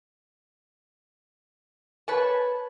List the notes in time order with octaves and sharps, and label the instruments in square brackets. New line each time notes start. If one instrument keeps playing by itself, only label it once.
[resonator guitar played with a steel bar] B4 C#5 A5